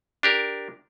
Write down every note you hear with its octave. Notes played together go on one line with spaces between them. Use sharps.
D4 G4 A#4